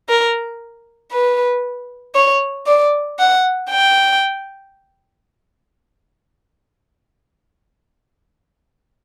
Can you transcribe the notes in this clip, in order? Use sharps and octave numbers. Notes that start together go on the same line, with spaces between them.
A#4
B4
C#5
D5
F#5
G5